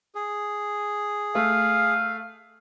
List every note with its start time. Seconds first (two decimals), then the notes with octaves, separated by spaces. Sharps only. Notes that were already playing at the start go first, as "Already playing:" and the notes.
0.15 G#4
1.35 A3 F5